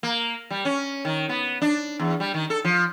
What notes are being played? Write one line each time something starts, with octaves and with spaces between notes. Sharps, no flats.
A#3
G3
C#4
D#3
B3
D4
E2
G3
D#3
A4
F3